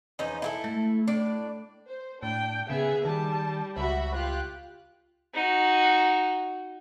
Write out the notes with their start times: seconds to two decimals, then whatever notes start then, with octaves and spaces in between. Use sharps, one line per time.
0.19 E2 F3 C#4 D#4
0.42 E4 F4 A4
0.64 A3
1.07 A2 D4 D5
1.88 C5
2.23 A2 D4 G5
2.70 C#3 B3 G#4 E5 G#5
3.05 D#3 G3 A5
3.77 C#2 F#4 E5 B5
4.15 F4 G4 F#6
5.34 D#4 F#4